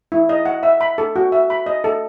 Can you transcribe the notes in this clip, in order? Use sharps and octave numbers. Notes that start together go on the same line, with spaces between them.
E4
D#5
F#5
E5
B5
A4
F#4
E5
B5
D#5
A4